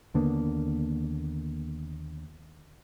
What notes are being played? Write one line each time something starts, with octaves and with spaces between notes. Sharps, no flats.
D#2 D3 A#3 B3